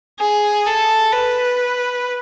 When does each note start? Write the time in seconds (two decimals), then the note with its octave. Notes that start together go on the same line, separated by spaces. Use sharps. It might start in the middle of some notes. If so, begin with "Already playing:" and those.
0.20 G#4
0.66 A4
1.12 B4